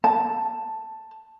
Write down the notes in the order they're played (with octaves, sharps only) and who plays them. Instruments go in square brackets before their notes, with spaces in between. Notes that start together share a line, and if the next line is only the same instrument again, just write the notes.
[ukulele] A5